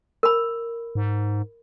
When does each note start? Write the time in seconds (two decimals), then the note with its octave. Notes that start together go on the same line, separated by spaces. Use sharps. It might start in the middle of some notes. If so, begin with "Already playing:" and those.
0.23 A#4 B5
0.95 G#2